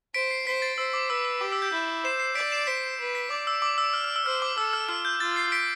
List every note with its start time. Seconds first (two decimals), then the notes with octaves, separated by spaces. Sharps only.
0.14 C5 B6 D7
0.31 C7
0.46 C5 B6
0.62 A6
0.78 C5 E6
0.93 D6
1.10 B4 E6
1.25 E6
1.41 G4 D6
1.52 E6
1.62 G6
1.72 E4 G6
2.04 C5 C7 E7
2.20 C7 E7
2.35 D5 B6 D7
2.52 C7 E7
2.67 C5 B6 D7
2.99 B4
3.15 B6
3.30 D5 D6
3.47 E6
3.62 D6
3.78 E6
3.93 F6
4.04 F6
4.16 E6
4.26 C5 F6
4.42 D6
4.58 A4 E6
4.73 F6
4.89 F4 F6
5.05 G6
5.20 F4 A6
5.36 C7
5.52 B6 D7